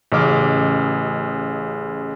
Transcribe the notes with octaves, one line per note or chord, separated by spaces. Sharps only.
A1 C#3 D#5 D6 F6